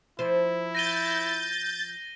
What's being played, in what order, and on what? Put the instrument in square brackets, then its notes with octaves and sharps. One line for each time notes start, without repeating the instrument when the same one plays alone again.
[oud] F3 C5 [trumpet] E4
[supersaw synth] G6 A6 [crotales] A#6 D#7 G7